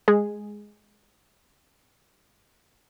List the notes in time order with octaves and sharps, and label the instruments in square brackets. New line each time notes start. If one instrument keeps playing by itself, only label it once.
[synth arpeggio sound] G#3 G#4